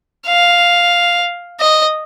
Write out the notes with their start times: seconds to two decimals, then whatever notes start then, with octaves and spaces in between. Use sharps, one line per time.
0.27 F5
1.60 D#5